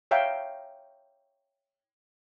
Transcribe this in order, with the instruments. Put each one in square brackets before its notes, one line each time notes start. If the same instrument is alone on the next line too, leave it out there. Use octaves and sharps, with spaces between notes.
[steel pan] C#5 E5 F5 G5 A#5